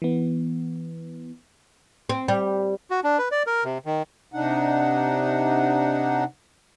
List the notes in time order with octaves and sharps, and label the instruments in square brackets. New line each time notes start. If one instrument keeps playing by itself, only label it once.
[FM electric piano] E3 B3
[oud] C4
G3
[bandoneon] F#4
D4
B4
D5
A#4
C3
D#3
[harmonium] C3 D4 D#4 F#5